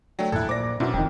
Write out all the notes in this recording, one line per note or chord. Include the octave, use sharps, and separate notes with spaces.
D3 F#3 A3 D5 G5
E1 A#1 E4 A4 F#6 G#6
A#2 C5 D5 D6 A#6
F#2 B2 D4 E4 F#4
E1 F2 D#3 G5